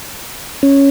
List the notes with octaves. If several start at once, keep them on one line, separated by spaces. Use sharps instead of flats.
C#4